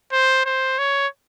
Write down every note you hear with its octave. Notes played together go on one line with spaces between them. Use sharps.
C5
C5
C#5